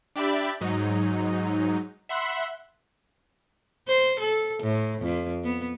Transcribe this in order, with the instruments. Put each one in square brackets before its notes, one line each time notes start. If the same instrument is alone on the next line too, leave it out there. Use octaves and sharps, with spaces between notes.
[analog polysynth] D4 G4 D5 E5 B5
G#2 F#3 D#4
E5 F#5 B5 C6 F#6 B6
[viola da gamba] C5
A4
A2
F2
B3